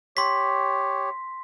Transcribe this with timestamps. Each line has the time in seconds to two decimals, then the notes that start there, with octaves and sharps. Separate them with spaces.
0.17 G4 C#5 C6 B6